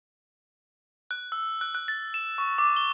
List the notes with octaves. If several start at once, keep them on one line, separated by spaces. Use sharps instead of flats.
F#6
E6
F#6
F#6
A6
E7
C#6
D6
G7